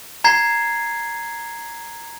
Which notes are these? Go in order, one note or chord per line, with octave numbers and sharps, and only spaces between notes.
A#5 G#6 C7